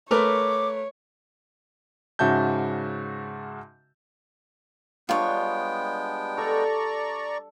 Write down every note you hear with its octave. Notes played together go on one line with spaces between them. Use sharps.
A3 A#4 B4 C#5 D6
G#2 C#3 F#4 E5 A5 G6
G3 G#3 B3 D4 F4 C#5 G5
A4 D5 A#5 C#6